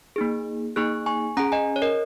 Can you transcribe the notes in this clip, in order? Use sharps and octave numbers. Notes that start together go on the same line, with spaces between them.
A#3 D#4 G#4
A#3 D#4 G#4 C#6 F#6
G#5 C#6
C#4 G#4 F#5 A#5
D#5 G#5
C#5
A#4 D#5